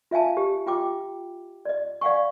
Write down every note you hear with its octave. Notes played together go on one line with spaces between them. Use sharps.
F4 E5 F5 G#5 A5
G4
F4 G5 D6
D5 D#5
D5 F5 F#5 G#5 C#6